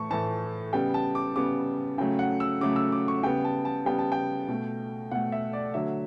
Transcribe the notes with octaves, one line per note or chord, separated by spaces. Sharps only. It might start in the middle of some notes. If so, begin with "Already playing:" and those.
Already playing: A2 E3 A3 A5 C#6
A2 E3 A3 A5
C#3 G3 B3 G5
A5
D6
C#3 G3 B3 D6
C#3 F#3 A3 G5
F#5
E6
C#3 F#3 A3 D6
E6
D6
C#6
C#3 G3 B3 G5
A5
A5
C#3 G3 B3 G5
A5
G5
B2 A3
B2 A3 F#5
E5
D5
D3 F#3 A3 E5